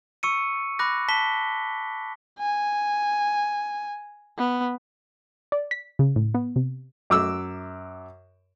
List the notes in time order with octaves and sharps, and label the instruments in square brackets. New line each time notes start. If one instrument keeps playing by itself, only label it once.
[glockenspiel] C#6 E6 C#7 D#7
B5 D6 F#6 A#6
A5 B6 G7
[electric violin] G#5
B3
[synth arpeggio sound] D5
B6
C#3
A2
B3
C3
[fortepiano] F#2 D6 E6